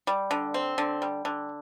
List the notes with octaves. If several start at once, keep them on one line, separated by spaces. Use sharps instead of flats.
G3
D3
C4
D3
G3
D3